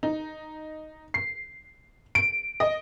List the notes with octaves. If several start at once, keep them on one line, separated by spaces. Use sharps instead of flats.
D#4
C7
D7
D#5